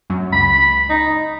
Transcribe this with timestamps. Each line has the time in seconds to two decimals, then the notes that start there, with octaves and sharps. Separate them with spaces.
0.10 F#2
0.32 C#2 B5
0.89 D#4